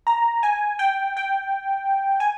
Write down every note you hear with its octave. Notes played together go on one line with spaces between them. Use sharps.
A#5
G#5
G5
G5
G#5